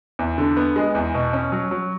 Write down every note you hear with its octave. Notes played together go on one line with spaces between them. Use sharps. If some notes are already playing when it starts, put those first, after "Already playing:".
E2
D3
B3
G#3
E2
B2
C#4
F#3
F#3